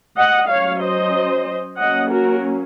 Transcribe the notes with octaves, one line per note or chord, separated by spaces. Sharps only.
D#5 F#5
F#3 C#4 C#5 F5
C5 D#5
F#3 A#3 C#4 D#5 F#5
F#4 A#4